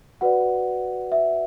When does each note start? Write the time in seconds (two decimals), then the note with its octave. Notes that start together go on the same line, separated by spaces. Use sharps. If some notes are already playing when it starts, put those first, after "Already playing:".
0.21 F#4 B4 D5 F#5
1.12 E5